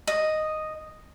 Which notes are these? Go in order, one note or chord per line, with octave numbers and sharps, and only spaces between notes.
D#5